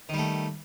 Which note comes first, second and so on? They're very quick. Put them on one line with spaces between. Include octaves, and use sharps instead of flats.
D#3 G3 A3